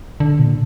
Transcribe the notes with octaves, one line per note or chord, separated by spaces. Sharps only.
D3
A#2